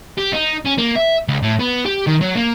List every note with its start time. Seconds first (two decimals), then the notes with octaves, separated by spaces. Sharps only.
0.18 G4
0.33 D#4
0.66 C#4
0.79 A#3
0.96 E5
1.28 C#2
1.42 A2
1.59 B3
1.86 G4
2.07 D#3
2.21 F#3
2.35 A#3